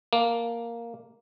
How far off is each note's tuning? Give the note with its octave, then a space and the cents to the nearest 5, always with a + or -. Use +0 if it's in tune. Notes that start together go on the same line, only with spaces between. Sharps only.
A#3 +0 A5 +0